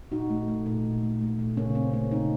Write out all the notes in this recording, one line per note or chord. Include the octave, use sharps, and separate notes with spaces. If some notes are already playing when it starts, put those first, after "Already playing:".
A#2 D#4 F#4
A3
A3
A#2
A#2
A3
A3
A#2
C#3 A#3 C#4
A3 C4
A3 A#3 C#4
C#3 C4 D#4